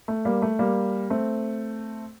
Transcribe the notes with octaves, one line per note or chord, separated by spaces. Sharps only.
A3
G3 A#3
A3
G3 A#3
A3 C4